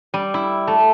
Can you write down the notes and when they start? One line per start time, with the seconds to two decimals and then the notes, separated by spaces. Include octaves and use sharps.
0.14 G3
0.34 E4
0.67 A3